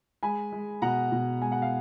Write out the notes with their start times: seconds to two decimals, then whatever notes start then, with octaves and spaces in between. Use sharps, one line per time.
0.23 G#3 G#5 B5
0.52 G#3
0.82 B2 F#5 A#5
1.12 B2
1.42 G#3 G#5
1.52 F#5
1.62 F5